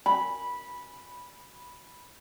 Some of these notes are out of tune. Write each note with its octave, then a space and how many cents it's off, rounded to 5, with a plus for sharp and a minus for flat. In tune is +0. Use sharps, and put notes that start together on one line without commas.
B5 -10